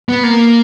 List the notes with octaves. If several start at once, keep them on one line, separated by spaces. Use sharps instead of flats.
B3
A#3